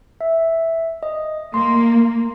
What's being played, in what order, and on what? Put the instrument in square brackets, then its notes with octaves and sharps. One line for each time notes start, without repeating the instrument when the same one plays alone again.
[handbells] E5
D#5
[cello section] A#3 [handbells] C6